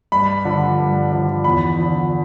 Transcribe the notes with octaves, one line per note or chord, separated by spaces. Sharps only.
G2 B5
D3 F3
G2
D3 F3
E2 B5
D3 F3